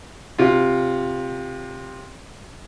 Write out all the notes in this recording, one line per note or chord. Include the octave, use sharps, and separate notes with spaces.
C3 F4